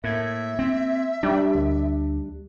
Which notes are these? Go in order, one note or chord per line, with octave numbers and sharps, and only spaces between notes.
A2 A#3 E5 G#6
C4
G3 D4
D2